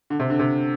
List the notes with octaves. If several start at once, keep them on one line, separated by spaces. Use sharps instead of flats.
D3
C3
D3
C3